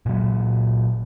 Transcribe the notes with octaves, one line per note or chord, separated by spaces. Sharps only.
A#2 F#3